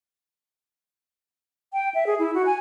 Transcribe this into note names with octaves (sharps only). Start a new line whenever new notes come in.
G5
E5
G#4
E4
F#4
G#5